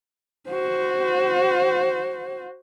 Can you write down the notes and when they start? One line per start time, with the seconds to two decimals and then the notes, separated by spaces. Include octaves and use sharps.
0.49 F#4 C5